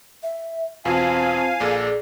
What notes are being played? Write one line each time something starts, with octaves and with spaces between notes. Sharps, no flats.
E5
E2 B2 C4 F4 C5 F5 G#5 A5
A#1 A#2 G#4 A4 D5